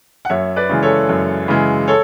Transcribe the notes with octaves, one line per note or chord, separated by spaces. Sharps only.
F#5
F#2 C#5 E5
B4 D5
C#3 E3 G#3
A4 C#5
F#2
C#3 E3 G#3
A4 C#5